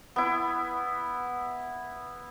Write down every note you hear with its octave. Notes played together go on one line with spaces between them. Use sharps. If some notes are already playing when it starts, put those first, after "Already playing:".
B3 E4